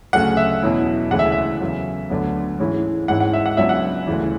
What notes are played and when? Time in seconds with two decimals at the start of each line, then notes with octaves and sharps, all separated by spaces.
0.13 D2 C#3 F#3 A3 F#5
0.37 E5
0.62 E2 B2 F#3 C#4 E4
1.11 D2 C#3 E3 G#3 F#5
1.19 E5
1.32 E5
1.61 E2 C#3 F#3
2.10 D2 D3 F#3 B3
2.59 G#2 E3 G#3 C#4 E4
3.08 G#1 G#2 G#3 C#4 E4 F#5
3.20 F#5
3.33 E5
3.46 F#5
3.57 C#2 C#3 F#3 B3 D4 E5
3.69 F#5
4.07 D2 C#3 E3